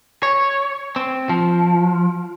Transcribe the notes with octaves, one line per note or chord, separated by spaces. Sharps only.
C#5
C4
F3